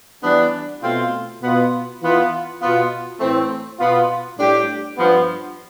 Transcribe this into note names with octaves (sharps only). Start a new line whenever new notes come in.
E3 G3 B3 D4
B2 A3 C4 F4
B2 B3 F4
E3 B3 F4
B2 B3 F4
A2 E3 A3 C4
B2 B3 F4
A2 G3 D4 G4
G2 F3 B3